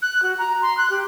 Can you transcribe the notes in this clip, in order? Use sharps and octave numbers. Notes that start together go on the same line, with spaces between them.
F#6
F#4
A#5
C6
F#6
G4